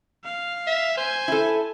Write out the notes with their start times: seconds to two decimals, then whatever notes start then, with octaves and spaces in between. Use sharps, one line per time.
0.24 F5
0.67 E5
0.98 C5 G#5
1.28 E4 A4